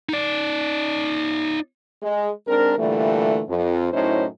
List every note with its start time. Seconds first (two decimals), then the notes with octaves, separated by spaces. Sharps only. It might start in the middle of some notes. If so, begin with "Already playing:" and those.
0.09 D#4 D5
2.02 G#3
2.47 G#2 C4 D4 A#4
2.78 A#2 D3 E3 G3 A3
3.49 F2
3.93 F#2 A2 C#4 D#4 E4 C5